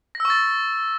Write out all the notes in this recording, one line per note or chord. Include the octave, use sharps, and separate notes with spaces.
A#6
E6
C#6
A6